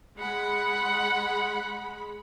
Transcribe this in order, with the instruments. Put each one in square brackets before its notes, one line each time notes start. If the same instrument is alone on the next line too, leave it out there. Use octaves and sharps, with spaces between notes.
[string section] G#3 B5 [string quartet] F#5